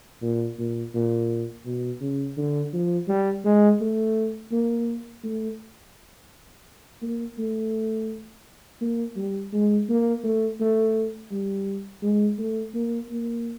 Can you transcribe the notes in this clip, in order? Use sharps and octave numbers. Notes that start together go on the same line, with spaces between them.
A#2
A#2
A#2
B2
C#3
D3
F3
G3
G#3
A3
A#3
A3
A#3
A3
A#3
G3
G#3
A#3
A3
A3
G3
G#3
A3
A#3
A#3